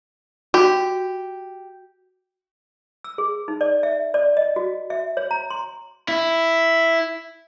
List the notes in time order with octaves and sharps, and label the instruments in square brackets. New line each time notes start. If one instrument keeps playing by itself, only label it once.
[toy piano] F#4 [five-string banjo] G4
[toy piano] E6
G#4
D#4
D5
E5
D5
D#5
F#4
E5
C#5
A#5
C6
[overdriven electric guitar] E4